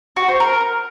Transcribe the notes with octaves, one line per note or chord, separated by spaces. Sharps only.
F#4
C5
A#4